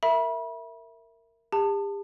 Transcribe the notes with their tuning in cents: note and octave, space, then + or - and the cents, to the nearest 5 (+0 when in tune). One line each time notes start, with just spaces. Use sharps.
A#4 -15 E5 +0 B5 -35
G4 +40 A5 +20